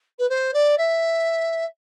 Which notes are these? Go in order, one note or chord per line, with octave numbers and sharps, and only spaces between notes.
B4
C5
D5
E5